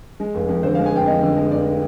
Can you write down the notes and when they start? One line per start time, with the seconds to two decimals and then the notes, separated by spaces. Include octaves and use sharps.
0.20 G#3
0.35 F1
0.49 F2
0.63 D3 C5
0.75 G#3 F5
0.86 G#5
0.93 F1 G5
1.07 F2 D#5
1.23 D3
1.36 G#3
1.51 F1 D5